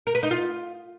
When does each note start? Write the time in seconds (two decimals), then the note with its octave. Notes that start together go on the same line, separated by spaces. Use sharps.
0.07 A#4
0.15 B4
0.23 D#4
0.31 F4